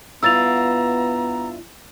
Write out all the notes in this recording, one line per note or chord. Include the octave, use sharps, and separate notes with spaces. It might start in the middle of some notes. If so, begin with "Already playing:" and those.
G2 B3 E4 F4 A#5 E6 A6 F7